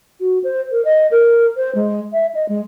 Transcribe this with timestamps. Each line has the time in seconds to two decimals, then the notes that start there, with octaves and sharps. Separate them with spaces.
0.20 F#4
0.44 C5
0.71 A#4
0.85 D#5
1.11 A#4
1.56 C5
1.75 G#3
2.12 E5
2.35 D#5
2.49 G#3